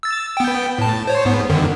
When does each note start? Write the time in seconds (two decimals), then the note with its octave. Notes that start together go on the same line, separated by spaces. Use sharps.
0.03 E6 A6
0.37 B3 G5
0.78 A2 A5
1.07 C5 C#5
1.25 G#2 B3
1.49 F#2 D3 D#3